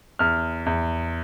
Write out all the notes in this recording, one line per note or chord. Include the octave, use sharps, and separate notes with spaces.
E2 F6
E2